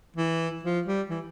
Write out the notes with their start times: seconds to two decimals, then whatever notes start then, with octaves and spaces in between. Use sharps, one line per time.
0.16 E3
0.63 F3
0.86 G3
1.10 E3